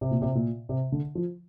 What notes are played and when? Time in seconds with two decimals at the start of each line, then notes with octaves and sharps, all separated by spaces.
0.01 C3
0.11 A#2
0.22 C3
0.35 A#2
0.69 C3
0.92 D3
1.15 F3